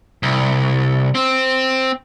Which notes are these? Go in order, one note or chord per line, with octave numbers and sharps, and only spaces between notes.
C2
C4